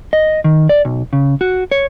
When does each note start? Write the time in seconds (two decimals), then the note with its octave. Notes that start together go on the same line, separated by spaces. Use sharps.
0.13 D#5
0.44 D#3
0.69 D5
0.85 B1
1.13 C#3
1.41 F#4
1.72 C#5